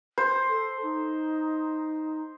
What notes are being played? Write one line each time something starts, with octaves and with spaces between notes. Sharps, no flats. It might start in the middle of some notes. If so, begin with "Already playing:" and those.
C5
A4
D#4